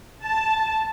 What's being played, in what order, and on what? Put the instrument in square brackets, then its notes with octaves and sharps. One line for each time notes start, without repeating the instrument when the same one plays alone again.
[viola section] A5